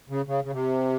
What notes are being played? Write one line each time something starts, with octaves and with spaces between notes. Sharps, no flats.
C#3
C#3
C#3
C3